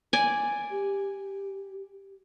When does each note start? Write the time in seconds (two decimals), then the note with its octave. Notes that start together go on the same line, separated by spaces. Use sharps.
0.13 D5 G#5
0.71 G4